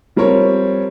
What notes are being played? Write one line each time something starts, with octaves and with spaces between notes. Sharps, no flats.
F3 G3 C4 A#4 C#5